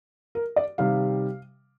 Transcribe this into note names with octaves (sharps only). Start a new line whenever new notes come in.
A#4
D5
C3 D#3 G3 F5